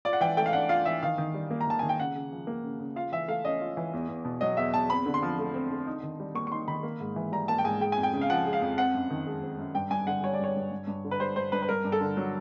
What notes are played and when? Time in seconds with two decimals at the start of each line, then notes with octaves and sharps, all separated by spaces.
0.05 F4 D5
0.13 F#5
0.21 E3 G5
0.37 A3 G5
0.46 F5
0.53 D4 F#5
0.69 F4 F5
0.85 E3 E5
1.03 D#3 F5
1.18 D#3
1.34 G3
1.51 A#3
1.61 A#5
1.67 D#3 A5
1.79 D#3 G#5
1.89 G5
1.99 C#3 F#5
2.15 C#3
2.32 F3
2.47 A#3
2.64 C#3
2.79 C#3
2.96 F4 F5
3.12 E3 E5
3.28 A3 F5
3.45 C#4 D#5
3.61 F4
3.77 E3
3.93 E2
4.08 E2
4.25 B2
4.41 F#3 D#5
4.57 E2 E5
4.74 E2 A5
4.90 C4 B5
5.06 D3
5.14 C6
5.22 F3
5.39 A3
5.54 C4
5.70 D3
5.87 D#4
6.03 D#3
6.20 G3
6.35 A#3 C#6
6.47 C#6
6.52 D#4 C6
6.67 D#3 B5
6.83 A#3
7.00 G#2
7.16 E3
7.32 G3 A#5
7.48 A#3 A5
7.58 G5
7.64 G#2 G#5
7.81 G#3 G5
7.92 G#5
7.97 F2
8.03 G5
8.13 C#3
8.21 F5
8.30 F3 F#5
8.45 G#3
8.53 F5
8.61 F2
8.77 C4 F#5
8.94 F#2
9.10 D#3
9.26 G#3
9.42 C4
9.58 F#2
9.75 G2 G5
9.90 G2 G#5
10.07 D3 F#5
10.23 G3 C#5
10.34 D5
10.39 G2 C#5
10.56 G2
10.71 G2
10.87 G2
11.05 D3
11.11 B4
11.20 G3 C5
11.36 G2 C5
11.52 G2 B4
11.62 B4
11.69 G2 A#4
11.85 G2
11.92 A4
12.01 D3
12.17 F#3